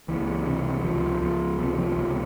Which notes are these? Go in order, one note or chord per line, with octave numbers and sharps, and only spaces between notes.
C#2 E3
C3
C#2 F3
C#2 F3
C3 F3
F3
C#2 F3